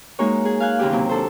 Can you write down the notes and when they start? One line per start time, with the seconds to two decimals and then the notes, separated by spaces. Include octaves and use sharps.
0.19 G#3 A#3 D#4 F#4 C#5
0.45 G#4
0.60 F5 G#5 F#6
0.79 D#2 A#2 C#3 E3 G4 D6
0.92 C3 F#3 A#3
1.09 D4 A4 C5